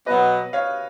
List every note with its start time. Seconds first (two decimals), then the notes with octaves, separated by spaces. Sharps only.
0.06 B2 F#3 B3 B4 D#5
0.53 C#5 F5